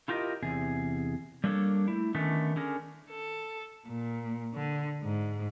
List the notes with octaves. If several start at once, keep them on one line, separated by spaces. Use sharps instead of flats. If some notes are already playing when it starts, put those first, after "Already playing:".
E4 F4 G4 A#4 D#5
E2 C3 G#4
G3 A#3 D4 A4 C#5
A3 E4
D3 D#3 A3 B3 C#4
D3 C#4 G#4 A#4
A4
A#2
D3
G#2